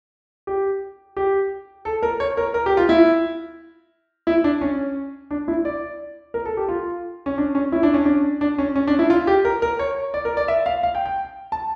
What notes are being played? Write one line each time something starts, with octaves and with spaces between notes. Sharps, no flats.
G4
G4
A4
A#4
C#5
A#4
A#4
G4
F4
E4
E4
D4
C#4
D4
E4
D5
A#4
A4
G4
F4
C#4
D4
C#4
E4
D4
C#4
D4
D4
C#4
C#4
D4
E4
F4
G4
A#4
A#4
C#5
D5
A#4
D5
E5
F5
F5
G5
G5
A5